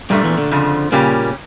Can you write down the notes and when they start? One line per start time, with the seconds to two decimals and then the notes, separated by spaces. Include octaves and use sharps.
0.10 G2 A#2 F3 G3 A3 D4
0.24 E2 E3
0.38 D3
0.51 F2 C#3 F3
0.92 A#2 C#3 G3 A#3 C#4 G4